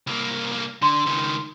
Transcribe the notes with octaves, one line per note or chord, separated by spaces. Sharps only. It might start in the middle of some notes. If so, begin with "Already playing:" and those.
C2 A#3
D3 C6
C#2 D#3